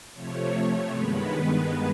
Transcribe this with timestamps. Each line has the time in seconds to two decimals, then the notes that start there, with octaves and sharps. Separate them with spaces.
0.14 C3 F3 A3 C#5
0.91 G2 D#3 G#3 B3 B4